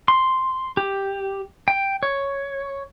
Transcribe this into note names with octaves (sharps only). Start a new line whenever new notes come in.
C6
G4
G5
C#5